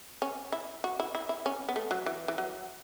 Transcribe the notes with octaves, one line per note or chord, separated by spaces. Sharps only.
C#4
E4
F#4
E4
E4
E4
C#4
B3
A3
F#3
E3
E3
F#3